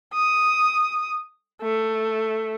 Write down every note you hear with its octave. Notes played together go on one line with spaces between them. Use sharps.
D#6
A3